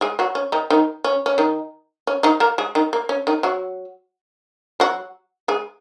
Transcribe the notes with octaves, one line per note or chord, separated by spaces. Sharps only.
G#3 G#4
F#3 F#4
C#4
D#3 D#4
D#3 D#4
C#4
C#4
D#3 D#4
C#4
D#3 D#4
A#3 A#4
G#3 G#4
D#3 D#4
A#3
C#4
D#3 D#4
F#3 F#4
F#3 F#4
G#3 G#4